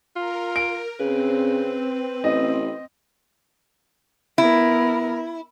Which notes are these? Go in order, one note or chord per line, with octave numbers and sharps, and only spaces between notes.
F4 A#4
D7
C#3 C4 B4
A1 D#5
B3 E4 A#4